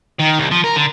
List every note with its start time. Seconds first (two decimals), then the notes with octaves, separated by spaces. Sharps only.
0.20 D#3
0.38 C2
0.51 F3
0.64 A#4
0.76 D3